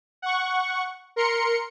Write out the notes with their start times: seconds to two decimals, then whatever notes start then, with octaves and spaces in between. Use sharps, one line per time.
0.22 F#5 C#6
1.16 A#4 C6 C#7